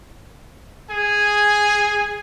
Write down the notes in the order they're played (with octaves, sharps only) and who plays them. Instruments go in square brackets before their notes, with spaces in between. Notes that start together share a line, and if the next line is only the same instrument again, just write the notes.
[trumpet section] G#4 G#5